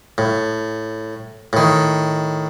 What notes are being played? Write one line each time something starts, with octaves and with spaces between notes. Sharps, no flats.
A2
A2 D#3